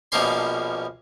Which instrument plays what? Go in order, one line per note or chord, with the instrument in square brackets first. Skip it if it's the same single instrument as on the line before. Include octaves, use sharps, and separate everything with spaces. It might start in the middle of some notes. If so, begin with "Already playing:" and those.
[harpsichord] A#1 B2 F3 A#3 C#4 C6